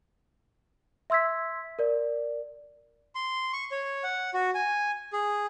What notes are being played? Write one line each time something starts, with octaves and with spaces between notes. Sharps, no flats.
E5 C6 E6 G#6 B6
A#4 D5
C6
C#6
C#5
F#5
F#4
G#5
G#4